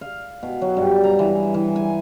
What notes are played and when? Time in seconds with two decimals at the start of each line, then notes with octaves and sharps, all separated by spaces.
0.01 F5
0.43 B2
0.61 F#3
0.77 G2
1.04 A#5
1.19 E3
1.54 E3
1.76 G#5